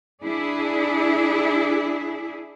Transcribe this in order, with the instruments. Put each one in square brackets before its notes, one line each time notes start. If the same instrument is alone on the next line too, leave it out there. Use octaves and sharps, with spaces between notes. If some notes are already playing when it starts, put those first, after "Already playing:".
[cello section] D4 E4 G#4